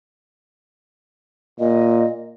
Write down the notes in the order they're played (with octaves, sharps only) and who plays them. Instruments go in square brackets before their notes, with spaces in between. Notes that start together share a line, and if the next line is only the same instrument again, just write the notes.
[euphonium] A#2 [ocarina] D#5